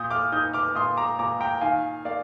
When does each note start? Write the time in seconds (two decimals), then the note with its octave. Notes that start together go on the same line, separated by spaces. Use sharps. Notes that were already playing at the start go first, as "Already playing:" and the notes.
Already playing: A#2 D#6 G6
0.11 D6 F6
0.32 D#4 D#6 G6
0.54 D6 F6
0.75 A#2 C6 D#6
0.97 A#5 D6
1.19 A#2 A#5 D6
1.41 G5 A#5
1.61 D#3 F5 G#5
2.05 A#3 D5 F5